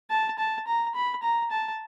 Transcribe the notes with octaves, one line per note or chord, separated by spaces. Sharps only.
A5
A5
A#5
B5
A#5
A5